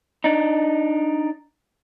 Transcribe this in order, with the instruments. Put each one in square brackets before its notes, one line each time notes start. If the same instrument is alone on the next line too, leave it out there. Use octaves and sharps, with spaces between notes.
[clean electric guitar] D4 D#4